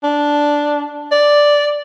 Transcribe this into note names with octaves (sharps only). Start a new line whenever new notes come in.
D4
D5